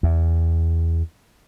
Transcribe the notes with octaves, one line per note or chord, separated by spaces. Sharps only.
E2